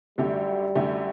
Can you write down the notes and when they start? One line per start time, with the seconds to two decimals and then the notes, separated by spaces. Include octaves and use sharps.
0.18 F#2 D3 G3 A3 E4 G4
0.75 F#2 D3 A3 E4 G4